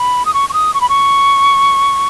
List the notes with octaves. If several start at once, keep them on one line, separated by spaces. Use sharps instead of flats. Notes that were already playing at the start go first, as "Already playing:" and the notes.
Already playing: B5
D#6
C#6
C#6
D#6
C#6
B5
C#6